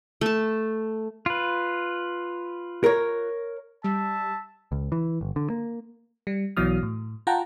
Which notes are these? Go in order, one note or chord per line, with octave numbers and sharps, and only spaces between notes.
A3 A5
F4 B4
A#4 C#5
G3 E5 A5
C#2
E3
G1
D3
A#3
G3
B1 B2 E3 F#3 D#6 F6
A2
F4 F#5 G5 A5 A#5